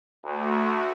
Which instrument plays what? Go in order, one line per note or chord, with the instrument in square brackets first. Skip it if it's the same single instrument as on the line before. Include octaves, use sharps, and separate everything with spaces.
[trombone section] D2 [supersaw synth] A3 F#4